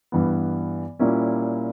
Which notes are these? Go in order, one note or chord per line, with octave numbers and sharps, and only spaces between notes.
G2 E3 G3 B3
A#2 G3 A#3 C#4 E4